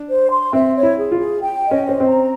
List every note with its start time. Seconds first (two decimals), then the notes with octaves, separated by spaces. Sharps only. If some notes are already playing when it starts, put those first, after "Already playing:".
Already playing: D4
0.10 C5
0.31 C6
0.53 C4 E5
0.76 C#5
0.83 E4
0.98 G#4
1.12 F4
1.19 G#4
1.42 G5
1.64 D#5
1.71 C#4
1.85 C#4 C5
2.00 C4
2.07 A#5